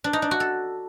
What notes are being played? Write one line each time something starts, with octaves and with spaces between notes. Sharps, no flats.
D4
D#4
D4
F#4
A4